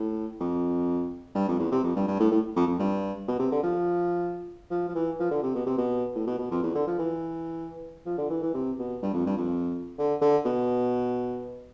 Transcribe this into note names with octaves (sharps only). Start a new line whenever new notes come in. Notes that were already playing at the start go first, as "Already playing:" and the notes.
Already playing: A2
F2
G2
F2
E2
C3
F2
G2
G2
A2
A2
F2
F2
G2
B2
C3
D3
F3
F3
F3
E3
F3
D3
C3
B2
C3
B2
A2
B2
B2
F2
E2
D3
F3
E3
F3
D3
E3
E3
C3
B2
G2
F2
G2
F2
D3
D3
B2